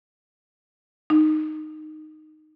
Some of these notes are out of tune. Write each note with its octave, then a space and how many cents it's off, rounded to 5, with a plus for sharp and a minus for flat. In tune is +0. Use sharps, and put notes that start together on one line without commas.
D#4 -10